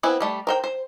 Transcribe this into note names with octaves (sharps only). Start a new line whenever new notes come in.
B3 C4 E4 B4 G#5
G3 A3 A5
A#4 C5 G5
C5